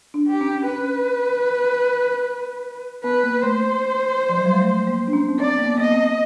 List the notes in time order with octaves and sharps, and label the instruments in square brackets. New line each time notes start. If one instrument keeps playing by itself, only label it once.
[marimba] D4
[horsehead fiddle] G4
[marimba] C#4
[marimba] C#4 [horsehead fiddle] B4
[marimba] B3 [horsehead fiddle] B4
[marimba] A#3
[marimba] A3 [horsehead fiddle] C5
[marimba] F3
F#3
G3
G#3
A3
A#3
D4
C#4
B3
[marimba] C4 [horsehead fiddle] D5
[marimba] A#3
B3
[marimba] A#3 [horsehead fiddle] D#5
[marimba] B3
C4